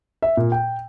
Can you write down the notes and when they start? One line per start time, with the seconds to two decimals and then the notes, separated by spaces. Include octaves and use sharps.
0.22 E5
0.37 A#2
0.52 G5